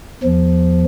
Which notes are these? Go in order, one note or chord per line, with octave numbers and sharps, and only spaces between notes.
E2 F3